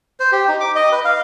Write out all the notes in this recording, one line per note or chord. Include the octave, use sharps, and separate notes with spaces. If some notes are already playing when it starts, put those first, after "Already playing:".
C5
G4
D#4
D6
D#5
B4
F5